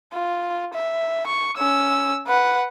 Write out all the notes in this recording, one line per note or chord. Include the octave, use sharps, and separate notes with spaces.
F4
E5
C#6
C#4 E6
B4 F#5